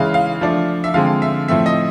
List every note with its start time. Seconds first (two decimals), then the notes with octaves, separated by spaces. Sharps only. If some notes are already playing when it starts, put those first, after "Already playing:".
Already playing: C#3 E3 G#3 F5
0.14 F5
0.41 F3 A3 D4
0.84 E5
0.94 D3 F3 G#3 C4 F5
1.22 E5
1.48 A2 F3 A3 C4 E5
1.66 D#5